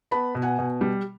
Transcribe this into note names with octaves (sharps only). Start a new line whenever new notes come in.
B3 A5 B5
B2
F#5 G#5
B2
G3